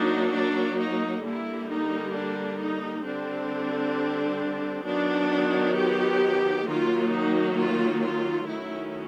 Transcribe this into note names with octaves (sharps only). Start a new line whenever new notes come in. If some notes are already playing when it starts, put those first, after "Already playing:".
Already playing: F#3 A#3 D4 D#4
D4
D#4
D3 G3 A#3 E4
D#4
D4
D#4
D3 G3 C4 D4
D#3 F#3 B3 D4
G4
D#3 F#3 A#3 F4
D#4
F4
F4
D#3 F#3 A3 C#4 E4